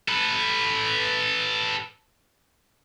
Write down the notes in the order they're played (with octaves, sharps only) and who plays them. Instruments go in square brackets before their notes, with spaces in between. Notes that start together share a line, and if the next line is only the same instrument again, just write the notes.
[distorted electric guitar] A4 B4